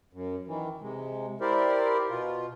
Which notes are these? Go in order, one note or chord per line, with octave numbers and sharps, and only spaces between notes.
F#2
D#3 E3
C3 G#3
E4 G4 A#4 C5 D5
B2 F4